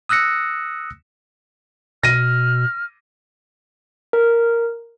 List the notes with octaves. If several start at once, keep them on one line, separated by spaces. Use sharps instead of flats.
D#6 E6 F#6 A#6 C#7
B2 F6 A#6 D#7
A#4